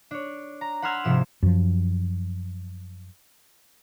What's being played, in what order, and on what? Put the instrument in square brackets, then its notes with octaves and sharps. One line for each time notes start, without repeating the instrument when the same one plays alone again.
[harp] D4 C#5
A#5
F#5 B5 C6 E6 F6 G#6
G#1 C3 F3 E7
[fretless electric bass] F#2 F3